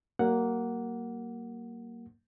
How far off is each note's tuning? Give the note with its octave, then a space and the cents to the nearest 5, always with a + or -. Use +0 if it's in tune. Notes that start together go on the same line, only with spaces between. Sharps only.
F#3 +45 A#3 +0 F#5 +0